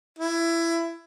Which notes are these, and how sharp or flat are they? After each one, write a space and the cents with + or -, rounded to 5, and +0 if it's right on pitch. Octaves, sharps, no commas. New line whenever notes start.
E4 +20